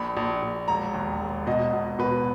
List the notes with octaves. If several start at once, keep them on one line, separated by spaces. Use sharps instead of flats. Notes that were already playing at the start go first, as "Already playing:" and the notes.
Already playing: A#1 B5
A#1
A#1
E1 A#5
D#2
E1
B2 D#5
B2
B2 B4